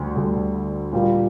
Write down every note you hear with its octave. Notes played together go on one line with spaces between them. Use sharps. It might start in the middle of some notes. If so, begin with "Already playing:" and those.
Already playing: D2 D3 G3
D2 D3 G3
A#2 G3 A#3